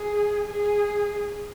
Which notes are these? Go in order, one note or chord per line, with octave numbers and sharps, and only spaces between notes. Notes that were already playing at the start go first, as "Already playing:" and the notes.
Already playing: G#4
G#4